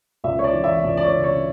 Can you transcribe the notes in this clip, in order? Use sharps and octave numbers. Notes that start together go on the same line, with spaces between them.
C#2 E5
C#5
D5
E3
E5
C#2 D5
D5
C#5
C#3
C#5